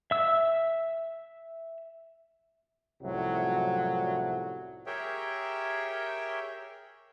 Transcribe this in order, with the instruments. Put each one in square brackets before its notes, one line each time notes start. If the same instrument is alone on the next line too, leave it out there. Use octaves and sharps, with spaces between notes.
[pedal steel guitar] E5 E6
[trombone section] C2 F#2 A2 F3 F#3
[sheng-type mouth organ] G4 G#4 A#4 C#5 E5 G5